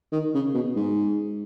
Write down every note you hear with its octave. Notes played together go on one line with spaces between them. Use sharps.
D#3
C#3
B2
G#2